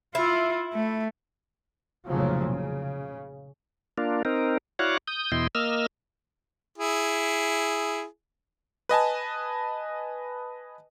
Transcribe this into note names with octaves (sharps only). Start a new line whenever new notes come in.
E4 F4
A3
F1 A#1 A#2 C#3 F3 F#3
C#3
A#3 D4 F4
C4 D#4 A#4
E4 F#4 C#5 D5 F5 F#5
D#6 G6
E2 B2 E4 D#5 G5 C6
A#3 D#5 E6 F6
E4 G#4
B4 D#5 G#5 A5